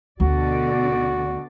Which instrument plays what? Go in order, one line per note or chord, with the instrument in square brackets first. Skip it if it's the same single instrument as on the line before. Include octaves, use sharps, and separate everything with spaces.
[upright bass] D2 [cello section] B2 D3 D5 [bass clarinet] F#4